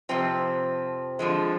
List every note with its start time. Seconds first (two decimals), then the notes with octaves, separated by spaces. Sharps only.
0.09 F2 C3 F3 C4
1.19 D3 F3 G#3